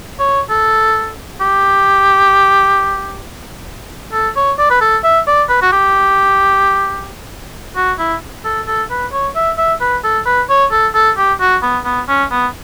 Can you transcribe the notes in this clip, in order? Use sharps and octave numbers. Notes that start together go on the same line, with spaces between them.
C#5
A4
G4
A4
C#5
D5
B4
A4
E5
D5
B4
F#4
G4
F#4
E4
A4
A4
B4
C#5
E5
E5
B4
A4
B4
C#5
A4
A4
G4
F#4
B3
B3
C#4
B3